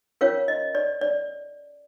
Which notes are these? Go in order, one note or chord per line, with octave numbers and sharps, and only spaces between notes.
C#4 F4 A#4 C#5 F5
D#5
D5
D5